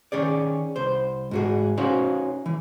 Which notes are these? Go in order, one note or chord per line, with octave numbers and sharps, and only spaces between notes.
D#3 C#4 G#4 D5
C2 C5
G#2 F#4 G#4
C#4 D#4 F#4 C5 C#5 F5
E3